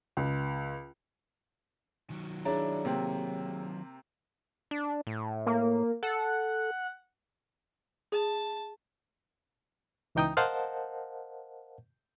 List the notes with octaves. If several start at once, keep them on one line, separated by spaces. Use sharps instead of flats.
C#2
D#3 F#3
D4 E4 G#4 C#5 D5 A#5
C3 A#3 C4
D4
A2
A#3
A4 F#5
G#4 A5
C#2 E3 D#4 G5 A#5 D#6
A#4 C5 D#5 F5 F#5 A5